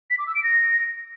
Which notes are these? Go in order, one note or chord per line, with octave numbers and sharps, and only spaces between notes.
B6
D6
E6
D7
A#6